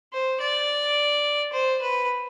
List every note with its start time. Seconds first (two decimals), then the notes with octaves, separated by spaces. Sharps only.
0.13 C5
0.40 D5
1.53 C5
1.82 B4